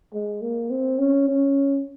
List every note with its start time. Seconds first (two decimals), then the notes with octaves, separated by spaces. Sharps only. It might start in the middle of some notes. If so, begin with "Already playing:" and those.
0.13 G#3
0.42 A#3
0.71 C4
0.99 C#4
1.28 C#4